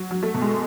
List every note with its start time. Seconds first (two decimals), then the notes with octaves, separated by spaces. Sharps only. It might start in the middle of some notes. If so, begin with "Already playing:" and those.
Already playing: F#3
0.11 F#3
0.23 A3
0.34 B2
0.41 G#3